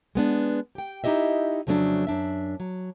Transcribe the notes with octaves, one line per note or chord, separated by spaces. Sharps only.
G#3 B3 D4
G4 G5
D#4 E4 G4 D#5 E5
F2 C#3 F#3 A3 C#4 D4
F#2 D4 E5
F#3